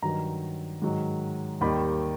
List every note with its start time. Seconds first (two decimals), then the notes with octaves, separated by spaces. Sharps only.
0.02 G2 D#3 F#3 A#5
0.82 G#2 D#3 F#3
1.61 D#2 D#3 G3 B5